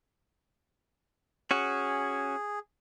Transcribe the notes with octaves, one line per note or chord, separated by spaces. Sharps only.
C#4 F#4 G#4